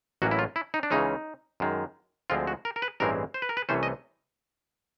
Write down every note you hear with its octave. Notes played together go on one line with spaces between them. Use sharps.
A1 A2 F#3 A#3 C#4 F#4
E4
F4
E4
D#4
D4
C#2 C#3 E3 G#3 C#4 D#4
F#2 D#3 G#3
D2 D3 F3 G#3 C4 F4
F#4
A#4
A#4
B4
A1 G2 E3 G#3 C4 A#4
C5
B4
A#4
B4
C2 C3 E3 A3 C#4 C5
D#5